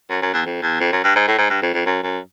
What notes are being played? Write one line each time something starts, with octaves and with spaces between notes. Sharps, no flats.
F#2
F#2
E2
F2
E2
F2
F#2
G2
G#2
A2
G#2
G2
F2
F2
F#2
F#2